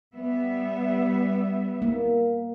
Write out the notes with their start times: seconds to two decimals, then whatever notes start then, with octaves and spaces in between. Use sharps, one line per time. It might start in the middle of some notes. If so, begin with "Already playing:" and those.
0.14 G3 B3 E5
1.82 A#3